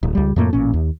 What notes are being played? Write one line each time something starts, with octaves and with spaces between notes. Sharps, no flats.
D1
C#2 G3
F2 A2 A3 A#3
A1 A#2 C#4
D#2